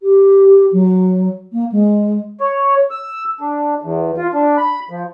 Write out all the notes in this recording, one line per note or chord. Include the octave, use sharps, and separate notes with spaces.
G4
F#3
A#3
G#3
C#5
E6
D4
E2
F4
D4
B5
F3